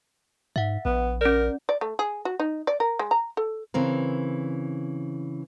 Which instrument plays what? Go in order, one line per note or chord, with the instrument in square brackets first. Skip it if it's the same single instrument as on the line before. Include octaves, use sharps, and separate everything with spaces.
[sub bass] G#2 [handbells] E5 F#5
[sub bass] A#1 [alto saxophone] B3
[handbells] C#4 D5 [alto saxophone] A#4
[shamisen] D5
A3
G#4
F#4
D#4
D5
A#4
G#3
A#5
A4
[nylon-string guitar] C#3 E3 C4 A#4